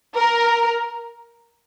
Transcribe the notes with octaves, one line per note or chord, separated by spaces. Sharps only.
A#4